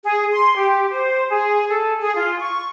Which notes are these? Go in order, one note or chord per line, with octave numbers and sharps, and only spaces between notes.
G#4
C6
G4
C5
G#4
A4
G#4
F4
C#6